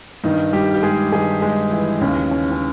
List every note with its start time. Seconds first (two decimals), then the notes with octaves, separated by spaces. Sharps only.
0.24 G2 D#3 D#4
0.53 G3 G4
0.74 G4
0.83 G#3 G#4
1.12 G2 D#3 G#3 G#4
1.42 G#3 G#4
1.71 E3 E4
2.01 D#2 C#3 E3 C#4
2.31 C#4
2.52 C#4